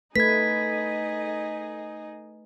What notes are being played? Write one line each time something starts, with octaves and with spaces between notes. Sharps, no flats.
A3 D#4 G#4 B4 D#5 G#6 B6